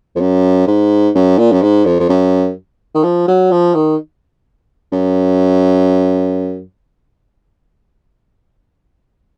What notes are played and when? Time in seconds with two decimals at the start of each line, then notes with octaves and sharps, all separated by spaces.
0.16 F2
0.21 F#2
0.67 G#2
1.15 F#2
1.38 A#2
1.52 F#2
1.62 G#2
1.85 F2
2.00 F2
2.09 F#2
2.95 D#3
3.04 F3
3.28 F#3
3.51 F3
3.75 D#3
4.92 F#2